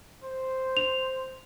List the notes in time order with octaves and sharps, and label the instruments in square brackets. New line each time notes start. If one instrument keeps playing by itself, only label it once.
[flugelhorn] C5
[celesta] F7